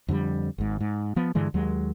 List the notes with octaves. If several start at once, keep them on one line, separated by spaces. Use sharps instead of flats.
F2 D3 E3 G3
G#1 G#2
G#2
F3 B3
G2 D3 E3 G#3
D#2 F#3 G#3